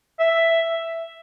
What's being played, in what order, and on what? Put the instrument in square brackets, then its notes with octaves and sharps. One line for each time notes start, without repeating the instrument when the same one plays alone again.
[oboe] E5